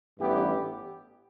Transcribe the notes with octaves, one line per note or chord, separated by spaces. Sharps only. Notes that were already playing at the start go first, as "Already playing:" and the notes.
A1 G2 E3 B3 G4